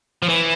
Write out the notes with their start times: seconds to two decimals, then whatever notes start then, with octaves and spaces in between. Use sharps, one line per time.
0.22 F3
0.29 E3